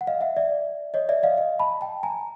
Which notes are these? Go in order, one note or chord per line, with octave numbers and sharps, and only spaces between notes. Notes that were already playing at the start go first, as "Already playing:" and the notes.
F#5
D#5 F5
E5 F#5
D5 E5
C#5 D#5
D5 E5
D#5 F5
D#5 F5
A5 B5
G5 A5
G#5 A#5